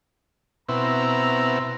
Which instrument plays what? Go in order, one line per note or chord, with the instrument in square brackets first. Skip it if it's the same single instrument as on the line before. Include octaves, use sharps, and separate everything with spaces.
[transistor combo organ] B2 C4 E4 [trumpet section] A#5